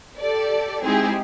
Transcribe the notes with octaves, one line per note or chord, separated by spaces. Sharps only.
G4 A4 D5
G#3 C4 D#4 E4 G4 G#4